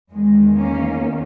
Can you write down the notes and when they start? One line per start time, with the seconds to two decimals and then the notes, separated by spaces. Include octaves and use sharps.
0.13 E2 D#3 G#3
0.57 A#3 C#4